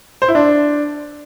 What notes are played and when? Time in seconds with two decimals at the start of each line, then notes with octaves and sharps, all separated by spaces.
0.22 C5
0.28 E4
0.35 D4